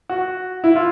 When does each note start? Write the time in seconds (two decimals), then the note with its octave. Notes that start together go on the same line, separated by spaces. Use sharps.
0.09 F#4
0.64 E4
0.76 F4